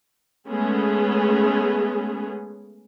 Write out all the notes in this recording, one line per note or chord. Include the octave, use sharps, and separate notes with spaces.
G#3 A3 B3 C#4 G#4